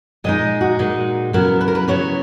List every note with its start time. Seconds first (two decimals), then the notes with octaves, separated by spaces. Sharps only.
0.24 A#2 G#3 D#4 D#5
0.61 F#4
0.79 A#2 G#3 D#4
1.33 C#3 F#3 B3 E4 A#4
1.61 B4
1.68 A#4
1.75 B4
1.88 C#3 F#3 B3 E4 C#5